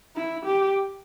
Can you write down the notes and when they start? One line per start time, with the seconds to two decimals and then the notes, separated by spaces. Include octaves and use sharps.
0.16 E4
0.46 G4